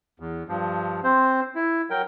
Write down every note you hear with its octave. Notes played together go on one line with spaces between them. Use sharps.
E2
G2 F3
C4 C5
E4
F#3 A#4 G5